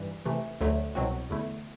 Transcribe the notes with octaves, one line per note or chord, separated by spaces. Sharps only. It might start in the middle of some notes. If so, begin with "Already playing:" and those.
Already playing: G2 E3 G3
C3 E3 A3
D2 D3 F#3 A3
C2 B2 F#3 C4 F#4
E2 D3 A3 E4